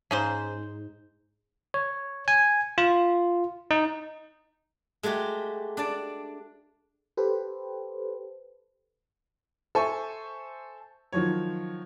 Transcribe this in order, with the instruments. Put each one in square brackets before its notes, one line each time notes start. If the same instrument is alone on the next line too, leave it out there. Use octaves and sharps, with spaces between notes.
[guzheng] G#2 [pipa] C#4 G#4 C5
[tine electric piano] C#5
G#5
F4
D#4
[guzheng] G#3 A3 F#4 G4
D4 D5 A5
[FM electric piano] G4 A4 B4 C5
[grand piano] A4 C5 E5 G#5 C#6
D#3 F3 F#3 C#5